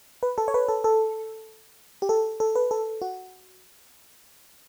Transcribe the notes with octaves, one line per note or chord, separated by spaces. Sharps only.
B4
A4
C#5
B4
A4
A4
G4
A4
A4
B4
A4
F#4